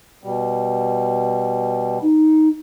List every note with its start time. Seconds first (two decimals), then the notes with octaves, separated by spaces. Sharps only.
0.24 B2 G3
2.02 D#4